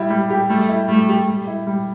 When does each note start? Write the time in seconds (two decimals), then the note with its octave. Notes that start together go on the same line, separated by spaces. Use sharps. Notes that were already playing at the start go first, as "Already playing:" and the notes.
Already playing: G3 E4
0.10 G3
0.30 G4
0.49 G3 A3
0.69 E4
0.88 G3 A3
1.09 G4
1.28 G3
1.47 E4
1.67 G3